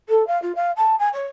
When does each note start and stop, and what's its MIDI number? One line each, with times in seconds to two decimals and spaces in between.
0.09 0.26 69
0.27 0.40 77
0.42 0.53 65
0.56 0.72 77
0.77 0.95 81
0.99 1.09 80
1.14 1.27 73